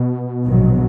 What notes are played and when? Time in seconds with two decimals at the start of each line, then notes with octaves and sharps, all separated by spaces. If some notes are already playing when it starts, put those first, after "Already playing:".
Already playing: B2
0.46 A#1 G#2 D#3 F#3